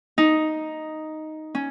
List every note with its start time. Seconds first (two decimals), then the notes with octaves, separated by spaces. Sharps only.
0.18 D#4
1.55 C#4